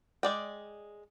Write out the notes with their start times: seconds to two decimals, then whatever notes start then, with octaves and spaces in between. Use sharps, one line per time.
0.23 G#3 D5 G5